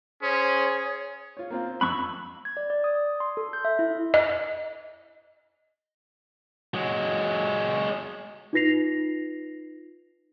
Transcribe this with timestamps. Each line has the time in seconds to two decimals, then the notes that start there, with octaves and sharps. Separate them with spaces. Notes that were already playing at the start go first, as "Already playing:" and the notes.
0.23 C#4 G#4 C5 C#5
1.37 F4 C#5
1.50 A#3 C4 F4
1.81 F2 B5 C#6 E6 F#6
2.45 G#6
2.57 D5
2.70 D5
2.84 D#6
3.20 C6
3.37 A4
3.53 G6
3.65 E5
3.79 E4
4.14 D#5
6.74 F#3 G#3
8.53 D#4 F4 B4 A#6 C7 F7